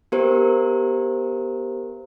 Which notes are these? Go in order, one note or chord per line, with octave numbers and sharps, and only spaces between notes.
B3 G4 A#4 C5